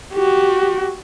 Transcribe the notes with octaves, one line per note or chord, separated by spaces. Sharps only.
F#4 G4